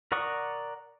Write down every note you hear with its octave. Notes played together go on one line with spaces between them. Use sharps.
A#4 D5 F#5 C#6 D#6